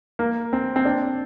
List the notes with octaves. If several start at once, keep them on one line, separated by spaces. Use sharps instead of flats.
A#3
C4
C4
D4